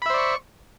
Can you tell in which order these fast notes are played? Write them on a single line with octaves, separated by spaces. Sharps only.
B5 E5 C5 D5 C#6